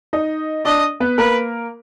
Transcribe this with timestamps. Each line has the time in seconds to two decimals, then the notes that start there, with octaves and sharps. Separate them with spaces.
0.13 D#4 D#5
0.65 D4 D5 D#5
1.00 B3 B4
1.18 A#3 A#4 B4